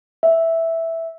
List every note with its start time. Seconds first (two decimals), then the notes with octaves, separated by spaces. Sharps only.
0.23 E5